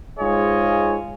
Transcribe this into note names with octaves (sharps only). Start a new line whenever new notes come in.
G#2 F4 G#4 C#5 D#5